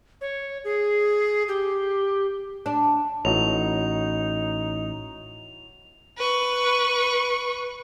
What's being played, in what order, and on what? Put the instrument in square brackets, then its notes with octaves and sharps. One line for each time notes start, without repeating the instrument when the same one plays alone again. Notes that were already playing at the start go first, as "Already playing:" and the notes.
[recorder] C#5
G#4
G4
[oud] D4
[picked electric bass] A1 [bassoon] D#4 [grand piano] E4 F#4 C#5 [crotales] F7
[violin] B4 C#6